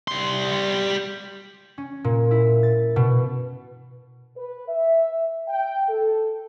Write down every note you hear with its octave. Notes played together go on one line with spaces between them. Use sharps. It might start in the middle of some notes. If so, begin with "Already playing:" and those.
G3 C6
C#4
A#2
E4
A6
B2
B4
E5
G5
A4